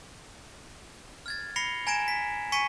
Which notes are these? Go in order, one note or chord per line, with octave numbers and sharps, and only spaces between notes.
F6 G#6 A6
B5 A#6 C7 C#7 F7 G7
G#5 A#5 G#6 A#6 D7 E7
B6
G#5 C#6 B6 C#7 D#7